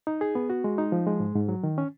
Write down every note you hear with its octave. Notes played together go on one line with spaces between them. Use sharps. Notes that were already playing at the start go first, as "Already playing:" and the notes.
D#4
G#4
B3
F#4
G#3
D#4
F3
G#3
G#2
G#2
F#3
D#3
C#4